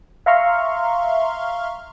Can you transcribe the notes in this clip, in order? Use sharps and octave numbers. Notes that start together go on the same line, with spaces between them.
E5 F5 A#5 C6 C#6 F6